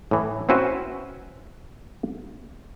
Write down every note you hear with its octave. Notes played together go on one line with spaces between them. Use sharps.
A2 E3
C4 C#4 E4 F#4 B4 C5